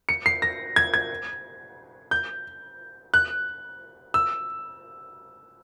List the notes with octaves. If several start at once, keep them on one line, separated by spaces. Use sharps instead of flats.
C#7
C7
A#6
G#6
G#6
G6
F#6
E6